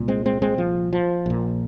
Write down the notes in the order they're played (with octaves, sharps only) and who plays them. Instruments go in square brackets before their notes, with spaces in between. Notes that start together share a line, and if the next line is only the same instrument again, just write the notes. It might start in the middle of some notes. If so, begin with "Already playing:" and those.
Already playing: [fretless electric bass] C2 A#2
G#3 C4
G#3 C4
G#3 C4
F3
F3
A#1 A#2